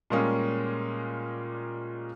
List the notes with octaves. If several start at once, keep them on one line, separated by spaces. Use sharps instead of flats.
A#2 G3 G#3 A#3 C#4 G#4